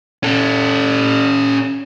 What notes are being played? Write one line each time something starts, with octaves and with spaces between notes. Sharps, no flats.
C#4 A4